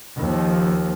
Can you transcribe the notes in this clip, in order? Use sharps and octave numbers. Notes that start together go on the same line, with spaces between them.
D#2 F3